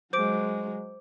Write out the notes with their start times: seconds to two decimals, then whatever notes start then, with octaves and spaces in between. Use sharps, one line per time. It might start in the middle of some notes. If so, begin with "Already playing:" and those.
0.13 F#3 G#3 C5 D6 D7